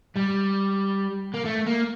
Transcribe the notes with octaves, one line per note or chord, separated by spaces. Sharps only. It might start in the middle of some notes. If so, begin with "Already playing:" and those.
G3
A#3
A3
A#3